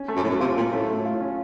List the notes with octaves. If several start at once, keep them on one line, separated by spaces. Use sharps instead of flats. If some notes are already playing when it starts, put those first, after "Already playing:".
Already playing: C#4
A3
F#2
A2 F#3
F#2
C3 F4
A#2 C#4
A2 A3
F#3
F4
C#4